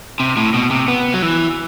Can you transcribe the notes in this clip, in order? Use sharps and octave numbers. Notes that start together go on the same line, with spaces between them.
C3
A2
B2
C3
B3
F#3
E3